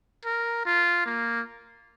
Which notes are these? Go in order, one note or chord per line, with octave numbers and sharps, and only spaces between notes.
A#4
F4
A#3